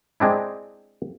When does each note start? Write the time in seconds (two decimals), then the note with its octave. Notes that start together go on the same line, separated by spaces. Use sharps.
0.20 G#3 C4 D4 E4